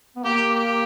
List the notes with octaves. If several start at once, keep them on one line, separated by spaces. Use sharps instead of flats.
B3
A#3 G4
G4